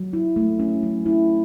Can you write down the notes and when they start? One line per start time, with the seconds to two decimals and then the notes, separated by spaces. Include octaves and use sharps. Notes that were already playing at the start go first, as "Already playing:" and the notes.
Already playing: F#3
0.13 E4
0.36 A3
0.60 C#4
0.83 F#3
1.06 E4